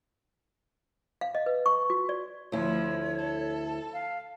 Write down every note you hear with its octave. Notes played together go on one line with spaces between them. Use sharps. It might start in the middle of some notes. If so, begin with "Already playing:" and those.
F5
D#5
B4
C#6
F#4
D5
D2 F3 E4 C#5
A4
F5